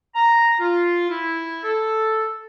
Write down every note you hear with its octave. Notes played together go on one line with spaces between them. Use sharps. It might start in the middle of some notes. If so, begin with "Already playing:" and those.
A#5
F4
E4
A4